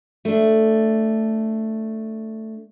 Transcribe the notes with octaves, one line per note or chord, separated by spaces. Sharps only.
A3 D4